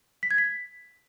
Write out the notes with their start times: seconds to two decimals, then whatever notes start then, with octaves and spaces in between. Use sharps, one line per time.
0.23 B6
0.31 G#6
0.38 B6